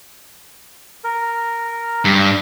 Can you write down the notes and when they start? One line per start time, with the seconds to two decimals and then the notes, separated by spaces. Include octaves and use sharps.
1.04 A#4
2.05 G2